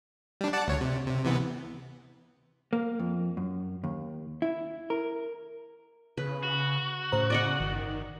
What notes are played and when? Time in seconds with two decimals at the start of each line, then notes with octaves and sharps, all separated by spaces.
0.41 G3 D4
0.53 D5 F#5 A5
0.68 D2 C#5
0.81 C3
1.06 C3
1.25 C3 E3 B3
2.73 A#3
2.99 F2
3.37 F#2
3.84 D#2
4.42 E4
4.90 A#4
6.18 C#3 B4
6.43 F#4
7.12 A2 C#3 C5 A#5
7.30 D5 D#5 F#5
7.60 G1 D#3